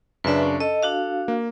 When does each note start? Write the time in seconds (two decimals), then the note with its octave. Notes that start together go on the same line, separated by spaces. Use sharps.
0.24 F#2 C#3 D4 B4 E5
0.43 C#4
0.60 A4 D#5
0.83 D4 F#4 F5
1.28 A#3